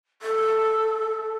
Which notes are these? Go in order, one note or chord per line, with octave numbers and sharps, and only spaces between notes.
A4